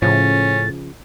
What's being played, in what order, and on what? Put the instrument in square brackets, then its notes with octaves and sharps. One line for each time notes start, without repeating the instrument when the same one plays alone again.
[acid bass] A2 [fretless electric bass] C#3 F3 [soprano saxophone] C#4 [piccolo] A6